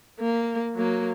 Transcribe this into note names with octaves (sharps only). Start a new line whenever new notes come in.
A#3
F#3 A#3